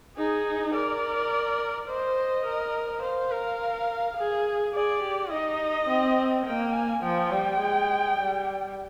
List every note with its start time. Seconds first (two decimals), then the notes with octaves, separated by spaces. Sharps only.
0.18 D#4 G#4
0.74 A#4 D5
1.88 C5 D#5
2.46 A#4
3.02 C5 F5
3.31 A#4
4.17 G#4
4.74 G#4 D5
5.03 G4
5.31 D#4 D#5
5.89 C4
6.46 A#3 G5
6.74 G#5
7.03 F3 G5
7.32 G3
7.60 G#3
8.18 G3